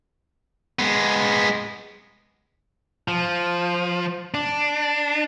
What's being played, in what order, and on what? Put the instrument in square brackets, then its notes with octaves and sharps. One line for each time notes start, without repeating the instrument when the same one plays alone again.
[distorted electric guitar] G#3 B3
[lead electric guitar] F3
D4